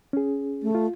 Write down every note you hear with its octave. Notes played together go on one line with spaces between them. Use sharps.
C#4 G#4
A3
F4